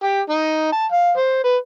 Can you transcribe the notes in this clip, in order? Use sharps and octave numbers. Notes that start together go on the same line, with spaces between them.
G4
D#4
A5
F5
C5
B4